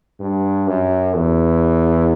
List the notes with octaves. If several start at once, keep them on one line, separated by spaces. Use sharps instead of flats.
G2
F#2
E2